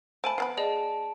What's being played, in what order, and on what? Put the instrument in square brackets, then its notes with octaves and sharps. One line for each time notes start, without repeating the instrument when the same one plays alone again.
[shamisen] A3 A5 [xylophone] C5 G#5 B5 [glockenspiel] D7
[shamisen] F3 B3 B5 [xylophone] C7
[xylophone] G#4 D5 D#5 [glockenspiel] A5